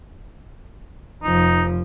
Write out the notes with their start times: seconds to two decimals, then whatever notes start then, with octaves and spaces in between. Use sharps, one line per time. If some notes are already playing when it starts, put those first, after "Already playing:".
1.23 F1 F3 D#4